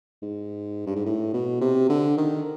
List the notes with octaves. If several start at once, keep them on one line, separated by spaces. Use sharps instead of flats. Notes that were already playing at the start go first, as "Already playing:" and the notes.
G#2
G2
G#2
A2
B2
C3
D3
D#3